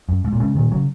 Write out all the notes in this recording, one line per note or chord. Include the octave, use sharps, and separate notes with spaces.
F#2
G#2
A#2
G#2 C#3
A#2 D#3
C#3 F#3